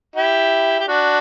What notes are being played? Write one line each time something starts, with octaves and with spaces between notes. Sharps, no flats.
E4 G4
G4
D4 F#4